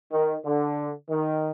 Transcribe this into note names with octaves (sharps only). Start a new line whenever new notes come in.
D#3
D3
D#3